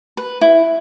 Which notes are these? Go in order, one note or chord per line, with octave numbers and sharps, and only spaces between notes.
B4
E4